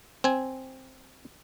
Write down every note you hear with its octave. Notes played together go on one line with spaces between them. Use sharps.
C4 G#5